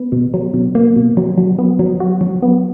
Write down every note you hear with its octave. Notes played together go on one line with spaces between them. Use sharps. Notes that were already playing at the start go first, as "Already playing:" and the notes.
Already playing: B3
B2
F#3
B2
A#3
B2
F#3
F#3
B3
F#3
F#4
F#3
B3